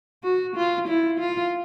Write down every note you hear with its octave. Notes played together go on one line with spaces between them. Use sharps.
F#4
F4
E4
F4